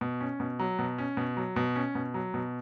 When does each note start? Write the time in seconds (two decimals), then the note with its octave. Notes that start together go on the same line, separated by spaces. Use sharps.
0.01 B2
0.21 C#4
0.40 B2
0.59 F#3
0.79 B2
0.98 C#4
1.17 B2
1.37 F#3
1.56 B2
1.75 C#4
1.95 B2
2.14 F#3
2.34 B2